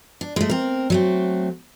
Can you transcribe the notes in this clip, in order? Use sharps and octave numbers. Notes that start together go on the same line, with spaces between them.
D4
G#3 A3
C4 A#4
F#3 A3 C4